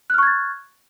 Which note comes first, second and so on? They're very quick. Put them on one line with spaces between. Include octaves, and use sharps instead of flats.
F#6 F6 C#6 G#6 A6